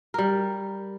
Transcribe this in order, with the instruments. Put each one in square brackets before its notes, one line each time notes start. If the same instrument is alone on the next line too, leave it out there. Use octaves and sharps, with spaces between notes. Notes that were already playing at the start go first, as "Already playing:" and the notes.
[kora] G3 A#4